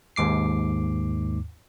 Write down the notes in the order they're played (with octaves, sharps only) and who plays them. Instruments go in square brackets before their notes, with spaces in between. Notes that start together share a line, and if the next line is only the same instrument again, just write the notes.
[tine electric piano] D#2 G#2 D6 C7